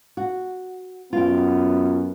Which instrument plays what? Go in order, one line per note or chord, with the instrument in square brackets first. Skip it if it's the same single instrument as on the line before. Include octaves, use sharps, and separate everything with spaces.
[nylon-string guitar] F#4
[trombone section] F#2 B3 [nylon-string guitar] F4 G5